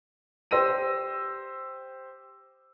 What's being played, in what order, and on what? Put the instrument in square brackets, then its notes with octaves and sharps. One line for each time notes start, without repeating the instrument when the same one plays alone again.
[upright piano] G4 C5 E6 A#6 D#7